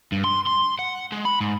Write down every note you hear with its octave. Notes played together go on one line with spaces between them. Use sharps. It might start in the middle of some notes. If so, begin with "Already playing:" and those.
G2
C6
C6
F#5
G#3
B5
G#2